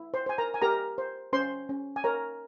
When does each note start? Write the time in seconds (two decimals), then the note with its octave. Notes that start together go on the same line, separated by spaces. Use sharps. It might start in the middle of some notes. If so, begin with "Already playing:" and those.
Already playing: E4
0.14 C5 C6
0.26 C5 G#5
0.38 A#4 A#5
0.54 G#5
0.62 G4 A#4 A#5
0.98 C5
1.33 C#4 C5 C6
1.69 C#4
1.96 G#5
2.04 A#4 C#5 A#5